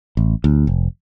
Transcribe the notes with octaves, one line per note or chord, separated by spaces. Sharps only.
A1
D2
F1